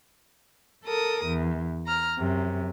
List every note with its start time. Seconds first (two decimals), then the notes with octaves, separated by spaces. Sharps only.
0.85 A4 A#4 D#6
1.26 E2
1.86 A#5 F6
2.19 F#2 C3